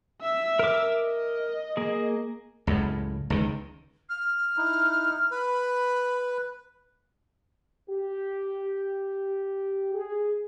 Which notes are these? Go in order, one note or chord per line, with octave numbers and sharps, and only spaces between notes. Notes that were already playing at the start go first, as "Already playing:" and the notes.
E5 E6
A#4 D6
D#5
A#3 G#4
C#2 F#2 A2
C#2 D#3
F6
D#4 E4
B4 B5
G4
G#4